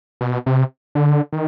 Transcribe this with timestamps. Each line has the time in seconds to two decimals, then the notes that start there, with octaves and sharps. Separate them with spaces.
0.21 B2
0.46 C3
0.95 D3
1.32 D#3